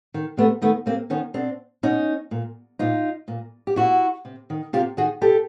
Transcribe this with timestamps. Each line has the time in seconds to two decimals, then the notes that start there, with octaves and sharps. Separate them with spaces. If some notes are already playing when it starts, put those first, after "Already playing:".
0.14 D#3
0.37 C3 A3 B3
0.62 D#3 A3 B3
0.86 C3 A#3 C4
1.10 D#3 B3 C#4
1.34 B2 C4 D4
1.83 B2 C#4 D#4
2.31 A#2
2.79 A#2 D#4 F4
3.28 A#2
3.67 G4
3.76 A#2 E4 F#4
4.25 C3
4.50 D#3
4.73 C3 F4 G4
4.97 D#3 F#4 G#4
5.21 B2 G4 A4